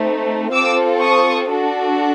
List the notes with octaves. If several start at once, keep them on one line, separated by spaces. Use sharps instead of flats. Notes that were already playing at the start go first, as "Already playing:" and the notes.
Already playing: A3 C4 D#4
C4 F4 A4 D6 E6
C#6 D#6
D4 F#4 A4